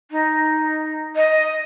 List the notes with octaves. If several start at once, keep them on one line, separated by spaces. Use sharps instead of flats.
D#4
D#5